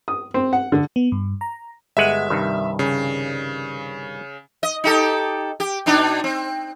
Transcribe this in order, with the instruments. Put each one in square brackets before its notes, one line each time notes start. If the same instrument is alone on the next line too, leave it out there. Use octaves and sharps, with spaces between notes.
[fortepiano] D#6
C4
F#5
D3
[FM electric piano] B3
G2
A#5
[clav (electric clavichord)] G1 G#3 F#5 [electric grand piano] E5
[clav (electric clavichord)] C2 G2 D#3
[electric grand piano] C#3
[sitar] D#5
D#4 G4 A4
G4
B2 D4 D#4
C4